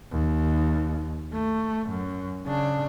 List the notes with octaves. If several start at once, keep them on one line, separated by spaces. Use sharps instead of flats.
D#2
A3
F#2
C#3 D4